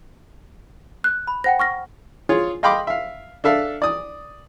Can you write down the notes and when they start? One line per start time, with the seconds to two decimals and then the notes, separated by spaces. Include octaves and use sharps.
1.04 F#6
1.27 B5
1.44 C5 F#5 G5 A#6
1.60 C#6 F6 A#6
2.29 F4 G#4 C#5
2.63 D#5 F5 G5 B5 C6 D6
2.87 E5 F5
3.44 D4 A4 E5 F5
3.82 D5 D#6